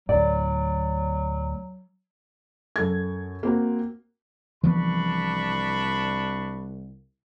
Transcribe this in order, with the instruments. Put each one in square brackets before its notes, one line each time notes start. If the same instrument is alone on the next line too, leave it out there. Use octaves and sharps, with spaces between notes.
[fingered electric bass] D2 A2 [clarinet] F#3 [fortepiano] D5
[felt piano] F#2 A4 G#6
A#3 C4 F#4
[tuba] C2 [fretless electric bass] E3 F3 B3 [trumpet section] D4 B5 C#6